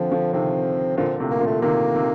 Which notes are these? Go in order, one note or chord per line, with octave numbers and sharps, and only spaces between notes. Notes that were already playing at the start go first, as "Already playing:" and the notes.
Already playing: D3 F3 C4
D3 F3
C3 D#3 C4
A#2 D3 C4
A2 C3
A#3
A#2 D3
A3
C3 D#3 A#3
C3 D#3